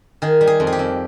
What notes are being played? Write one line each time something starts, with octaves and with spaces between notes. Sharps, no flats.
D#3 G#4
G3
G#4
F2
G#4
G4
F2